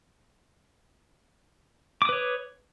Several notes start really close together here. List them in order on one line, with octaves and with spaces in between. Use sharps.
D6 D#6 B4 C#5